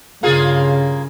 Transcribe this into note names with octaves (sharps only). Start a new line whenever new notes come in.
G2 C#3 A#3 F4 G#4